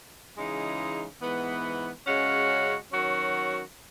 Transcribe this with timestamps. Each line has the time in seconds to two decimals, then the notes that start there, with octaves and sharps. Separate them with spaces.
0.36 C#3 E3 G#3 D#4
1.22 G#2 E3 B3
2.06 C#3 G#3 C#4 F#4
2.92 D#3 F#3 C#4 F#4